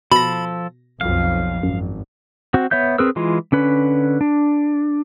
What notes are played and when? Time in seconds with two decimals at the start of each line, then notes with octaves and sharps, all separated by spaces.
0.12 B2 F3 A4 B5 A#6
1.01 B1 F2 F3 F5
1.63 G#1 F#2
2.54 C4 F#4
2.71 B3 C#5 E5 G6
2.98 C4 G#4 A#4 B4 E6
3.16 E3 G#3 F4
3.52 D3 C#4 B4
4.21 D4